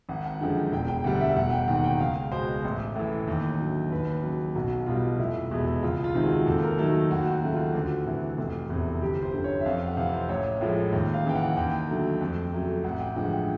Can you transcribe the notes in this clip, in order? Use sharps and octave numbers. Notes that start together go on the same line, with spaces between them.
G#1 F#5
F#5
F#2 D3 F3 G#3 G5
E1 G5
G5
D2 D3 G3 F#5
E5
E1 F#5
G5
D#2 D#3 F#5
G5
C#2 F5
B2 G#3 C5
A1
A2 E3
D#2
D3 F#3
D#2 B4
C#3 F#3
B1 F#4
B2 G3 F4
F1 E4
E2 B2 G#3
C#2 F4
F4
C3 D#3 G#3
F#4
D#2 A4
A#4
D#3 F#3 A3 A4
D#2 F#4
F#4
C#3 F#3 A3
F4
D2 F#4
C3 E3
F1
E2 C3
G1 G4
C5
F#2 D3
C#5
E5
F2 F5
F#5
C3 E3 F5
C5
A1 C#5
A2 F3 G#3
D#2
F5
C#3 E3 G5
F#5
D#2 G5
D3 F#3 A3
F2
C#3 F#3 A3
A1 F#5
G5
G2 D3 F3 G#3 F#5
G5